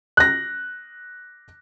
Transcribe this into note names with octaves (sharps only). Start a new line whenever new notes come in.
F#6 A#6